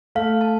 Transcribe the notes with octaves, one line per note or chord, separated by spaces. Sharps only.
A3 F5
A5